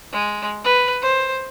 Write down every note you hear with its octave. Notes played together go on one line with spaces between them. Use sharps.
G#3
B4
C5